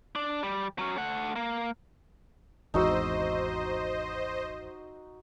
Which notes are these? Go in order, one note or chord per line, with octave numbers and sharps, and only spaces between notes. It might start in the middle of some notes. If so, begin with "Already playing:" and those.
D4
G3
F#3 C#4
A3 F#5
A#3
G#1 E2 D#4 F#4 C5 D#5 E6